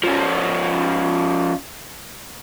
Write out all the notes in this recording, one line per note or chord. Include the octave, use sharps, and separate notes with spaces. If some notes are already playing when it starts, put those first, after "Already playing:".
F3 C#4